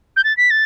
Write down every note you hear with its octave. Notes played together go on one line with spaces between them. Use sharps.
G6
A6
B6
A6